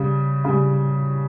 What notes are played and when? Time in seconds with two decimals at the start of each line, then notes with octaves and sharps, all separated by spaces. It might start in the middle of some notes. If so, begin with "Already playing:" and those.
Already playing: C#3 G3
0.45 C#3 G3